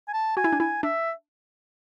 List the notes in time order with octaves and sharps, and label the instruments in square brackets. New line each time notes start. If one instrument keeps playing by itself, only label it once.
[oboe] G#5
A5
[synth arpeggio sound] F#4 [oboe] G#5
[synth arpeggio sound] E4
D4
[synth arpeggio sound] E4 [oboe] G#5
[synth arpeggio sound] D4 [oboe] E5